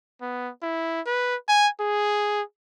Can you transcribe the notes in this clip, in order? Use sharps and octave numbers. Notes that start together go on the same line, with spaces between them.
B3
E4
B4
G#5
G#4